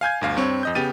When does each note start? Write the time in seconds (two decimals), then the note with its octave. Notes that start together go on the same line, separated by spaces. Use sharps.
0.01 F5 G#5 G6 G#6
0.21 G1 D2 F5
0.37 G2 C4 C#5
0.63 F2 D#5 G6
0.75 C#3 B3 G4 A6 D#7